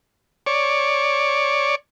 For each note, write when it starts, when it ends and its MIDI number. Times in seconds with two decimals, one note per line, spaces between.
0.46 1.75 73
0.46 1.75 74